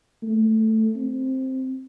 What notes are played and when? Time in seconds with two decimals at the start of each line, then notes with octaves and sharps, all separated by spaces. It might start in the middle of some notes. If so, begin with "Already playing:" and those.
0.22 A3
0.96 C4